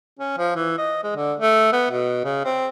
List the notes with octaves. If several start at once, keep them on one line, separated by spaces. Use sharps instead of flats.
C#4
F3
E3
D#5
G#3
D3
A3
B3
B2
C#3
C4